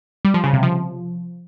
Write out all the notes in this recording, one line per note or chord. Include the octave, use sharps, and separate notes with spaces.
G3
F3
C#3
C3
F3